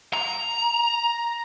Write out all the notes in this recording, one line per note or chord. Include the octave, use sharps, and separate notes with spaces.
A#5